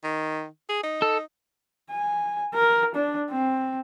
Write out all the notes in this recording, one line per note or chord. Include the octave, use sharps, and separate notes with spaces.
D#3
G#4
D#4
A4
G#5
A#4
D4
C4